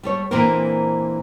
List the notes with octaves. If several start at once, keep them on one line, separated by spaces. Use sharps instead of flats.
G3 A3 C#5
A#2 E3 A#3 C4 D4 A#4